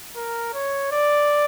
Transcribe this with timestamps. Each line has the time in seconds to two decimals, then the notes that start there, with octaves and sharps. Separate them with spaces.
0.16 A#4
0.54 C#5
0.92 D5